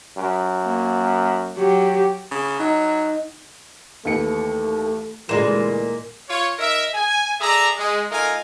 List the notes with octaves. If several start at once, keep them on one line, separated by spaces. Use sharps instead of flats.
F#2
A#3
F#3 G4
C#3
F#3 D#4
D#2 E3 A3 C#7
D2 A#2 E3 G#3 D5 E7
F4 C#5
D#4 A#4 E5
G#5
G#4 A4 D5 E5 A#5
G#3
A3 D#4 F4 A#4 G#5